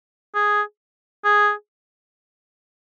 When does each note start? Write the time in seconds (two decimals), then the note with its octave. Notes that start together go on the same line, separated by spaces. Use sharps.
0.35 G#4
1.24 G#4